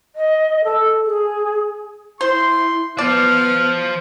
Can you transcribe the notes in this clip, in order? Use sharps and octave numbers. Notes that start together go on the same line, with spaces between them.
D#5
A4
G#4
E4 C5 C6
B3 C5 D5 A5 F6